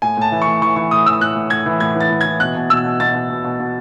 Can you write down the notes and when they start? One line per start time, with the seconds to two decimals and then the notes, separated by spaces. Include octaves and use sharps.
0.02 A2 G#5
0.17 A2 A5
0.32 E3
0.42 C#6
0.47 A2
0.62 E3 C#6
0.76 E3 C#6
0.91 A2 D#6
1.06 E3 E6
1.21 A2 F#6
1.36 A2
1.50 A2 G#6
1.66 E3
1.80 A2 G#6
1.95 E3
2.00 A6
2.10 A2
2.21 E3 G#6
2.40 B2 F#6
2.55 B2
2.70 B2 E6
2.85 B2
3.00 B2 A6
3.14 B2
3.30 B2
3.45 B2
3.60 B2